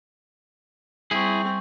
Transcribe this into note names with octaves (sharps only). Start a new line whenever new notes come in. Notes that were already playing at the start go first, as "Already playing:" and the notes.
G3 C4 E4 G#4 C#6